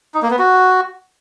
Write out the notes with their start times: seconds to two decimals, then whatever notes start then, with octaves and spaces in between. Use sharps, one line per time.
0.14 D#4
0.23 A#3
0.31 B3
0.39 F#4